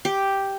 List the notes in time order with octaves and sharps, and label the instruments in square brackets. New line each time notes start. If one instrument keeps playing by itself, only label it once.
[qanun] G4